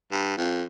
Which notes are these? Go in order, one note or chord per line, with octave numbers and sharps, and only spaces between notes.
G2
F2